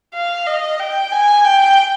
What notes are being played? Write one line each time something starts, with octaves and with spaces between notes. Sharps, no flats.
F5
D#5
G5
G#5
G5